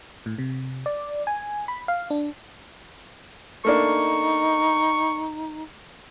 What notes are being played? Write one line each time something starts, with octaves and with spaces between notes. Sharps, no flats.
A2
C3
D5
G#5
B5
F5
D4
A3 A#3 D4 D#4 C#6